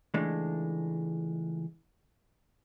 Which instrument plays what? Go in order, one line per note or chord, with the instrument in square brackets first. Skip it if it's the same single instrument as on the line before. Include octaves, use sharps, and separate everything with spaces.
[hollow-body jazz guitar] C#2 E3 G#3 A3 D4